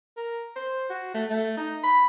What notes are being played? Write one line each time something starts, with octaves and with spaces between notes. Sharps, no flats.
A#4
C5
F#4
A3
A3
D#4
B5